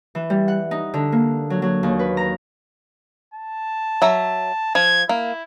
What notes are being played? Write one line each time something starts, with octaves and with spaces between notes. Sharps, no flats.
E3
G3
F#5
D#4
D3
A#3
F#3
F#3
D#2
B4
A#5
A5
F#3 E5 A#5
F3 G#6
A#3 E4